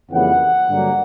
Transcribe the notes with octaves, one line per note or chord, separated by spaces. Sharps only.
F2 C#3 E3 G3 A#3 F#5
G2 D3 F#3 A#3